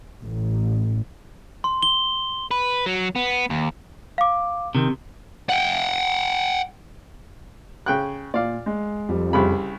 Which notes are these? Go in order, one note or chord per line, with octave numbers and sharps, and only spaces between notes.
A1
C6
G7
B4
F#3
B3
D#2
F5 D6
C3 D#3
F#5 G5
C#3 G5 F#6
A#2 D5 F5
G#3
F2 G3
C2 C#3 B5